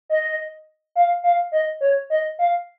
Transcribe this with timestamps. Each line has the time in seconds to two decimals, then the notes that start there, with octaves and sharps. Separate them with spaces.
0.10 D#5
0.96 F5
1.23 F5
1.52 D#5
1.81 C#5
2.10 D#5
2.39 F5